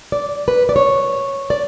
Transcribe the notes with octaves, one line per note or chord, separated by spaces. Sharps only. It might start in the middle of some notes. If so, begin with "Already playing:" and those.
D5
B4
D5
C#5
D5